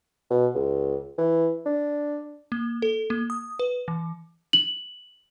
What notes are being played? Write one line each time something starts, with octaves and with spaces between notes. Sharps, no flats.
B2
C#2
E3
D4
A#3
A4
A#3
D#6
B4
E3
F#7